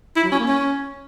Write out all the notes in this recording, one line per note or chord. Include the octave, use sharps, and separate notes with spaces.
E4
F#3
C#4
A#3
C#4